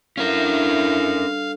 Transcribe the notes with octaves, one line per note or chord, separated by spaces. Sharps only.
G2 D3 C#4 E4 A#4 F5